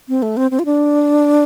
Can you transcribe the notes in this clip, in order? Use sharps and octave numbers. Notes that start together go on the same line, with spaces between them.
C4
A3
C4
C4
F4
D4